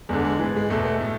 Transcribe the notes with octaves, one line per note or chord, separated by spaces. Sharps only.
E2 D3 G#3
G#3
G#2 E3
G#3
E2 B2 A3
A3
A2